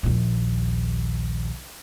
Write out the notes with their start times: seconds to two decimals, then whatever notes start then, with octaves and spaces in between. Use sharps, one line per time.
0.03 A#1 D#2